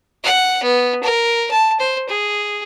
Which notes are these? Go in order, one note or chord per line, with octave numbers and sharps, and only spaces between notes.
F#5
B3
A#4
A5
C5
G#4